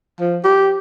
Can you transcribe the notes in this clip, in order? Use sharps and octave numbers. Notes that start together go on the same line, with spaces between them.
F3
G4